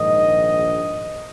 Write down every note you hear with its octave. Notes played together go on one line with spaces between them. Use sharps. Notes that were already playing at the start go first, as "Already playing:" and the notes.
Already playing: A#1 G#2 D#3 D#5